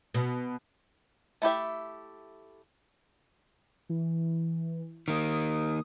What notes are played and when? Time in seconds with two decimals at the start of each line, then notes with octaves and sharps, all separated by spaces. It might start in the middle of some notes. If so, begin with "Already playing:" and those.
0.14 B2
1.42 A3 E4 G4 E5
3.89 E3
5.08 D#3 A#3 D#6